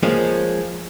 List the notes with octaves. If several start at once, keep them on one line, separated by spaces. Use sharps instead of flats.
F3 G#3 A#3 C#4